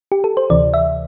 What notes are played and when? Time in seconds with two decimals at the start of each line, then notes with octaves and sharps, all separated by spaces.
0.12 G4
0.24 A4
0.37 C5
0.50 D2 C3 E3 D5
0.74 E5